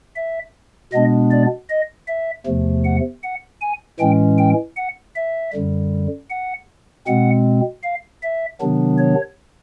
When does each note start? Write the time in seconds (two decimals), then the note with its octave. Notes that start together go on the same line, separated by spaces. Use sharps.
0.16 E5
0.92 B2 G#3 B3 D4 D#5
1.31 D5
1.69 D#5
2.08 E5
2.46 E2 C3 F3 A3
2.85 F#5
3.23 F#5
3.61 G#5
4.00 A2 E3 G#3 C#4 G5
4.38 G5
4.77 F#5
5.15 E5
5.53 F#2 D3 G3
6.30 F#5
7.07 B2 G#3 C4 F#5
7.83 F5
8.22 E5
8.61 C3 D#3 F#3 B3 D4
8.99 C#5